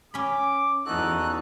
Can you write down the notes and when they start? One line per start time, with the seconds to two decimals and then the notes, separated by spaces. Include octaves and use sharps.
0.14 C#4 B5 D6
0.86 E2 E3 D#4 F#4 A4 F#6